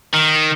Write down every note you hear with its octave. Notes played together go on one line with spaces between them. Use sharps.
D#3